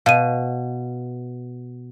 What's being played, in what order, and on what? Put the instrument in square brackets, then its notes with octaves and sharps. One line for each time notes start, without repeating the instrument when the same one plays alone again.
[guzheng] B2 [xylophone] F5 D#7